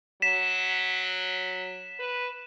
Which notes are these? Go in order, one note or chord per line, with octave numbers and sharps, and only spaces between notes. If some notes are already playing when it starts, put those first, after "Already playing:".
F#3 B6 E7
B4